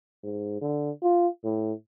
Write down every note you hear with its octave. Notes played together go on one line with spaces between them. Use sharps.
G#2
D3
F4
A2